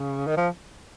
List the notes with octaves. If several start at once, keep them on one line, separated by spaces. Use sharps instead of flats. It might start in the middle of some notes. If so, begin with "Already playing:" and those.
Already playing: C#3
D#3
F3